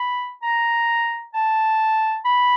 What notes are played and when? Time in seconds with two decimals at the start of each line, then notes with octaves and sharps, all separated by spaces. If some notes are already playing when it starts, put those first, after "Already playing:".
Already playing: B5
0.43 A#5
1.34 A5
2.25 B5